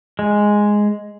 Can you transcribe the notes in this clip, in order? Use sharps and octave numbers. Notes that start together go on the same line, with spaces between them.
G#3